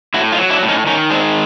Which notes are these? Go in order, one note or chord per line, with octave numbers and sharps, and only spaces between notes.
A2 E4 F#4
D#4 F4
F#3
D4 E4
A2
C#4 D#4
D#3 C#4 D#4
G#3 C4 D4